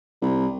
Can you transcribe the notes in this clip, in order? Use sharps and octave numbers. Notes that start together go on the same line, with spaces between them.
C2